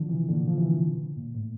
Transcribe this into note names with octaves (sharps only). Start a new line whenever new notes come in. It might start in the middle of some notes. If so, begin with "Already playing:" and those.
Already playing: D3 F3
C3 E3
A#2 D3
F3
C3 E3
A#2
A2